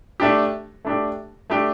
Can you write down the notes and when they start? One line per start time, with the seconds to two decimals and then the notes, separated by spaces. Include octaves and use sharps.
0.20 A3 D4 G4
0.85 A3 D4 G4
1.50 A3 D4 G4